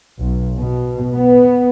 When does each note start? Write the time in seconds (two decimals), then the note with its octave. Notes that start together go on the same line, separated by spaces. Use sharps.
0.19 B1
0.56 B2
1.14 B3